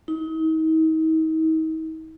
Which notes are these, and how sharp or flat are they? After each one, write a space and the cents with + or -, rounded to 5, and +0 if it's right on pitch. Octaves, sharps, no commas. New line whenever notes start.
D#4 +40